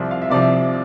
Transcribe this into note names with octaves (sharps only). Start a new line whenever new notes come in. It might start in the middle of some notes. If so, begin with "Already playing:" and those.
Already playing: C2 C3 F3 D5
F5
E5
C2 C3 F3 D5
E5